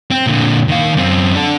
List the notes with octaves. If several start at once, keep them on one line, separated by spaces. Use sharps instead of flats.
C4
A#2 D3
D#3 F5
F#2 C4
D4 A4